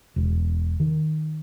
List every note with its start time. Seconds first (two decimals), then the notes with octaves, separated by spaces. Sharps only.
0.16 E1
0.80 D#3